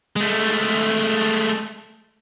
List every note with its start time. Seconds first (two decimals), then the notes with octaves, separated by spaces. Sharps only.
0.16 G#3 A3